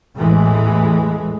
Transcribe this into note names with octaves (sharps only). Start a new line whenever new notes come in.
A1 E2 A2 E3 G#3